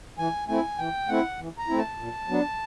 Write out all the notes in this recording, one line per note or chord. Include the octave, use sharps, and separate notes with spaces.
E3 G#5
A3 C4 E4 G#5
E3 G5
A3 C4 E4 F#5
E3
A#5
A3 C4 E4
A5
A#2
F#3 B3 D4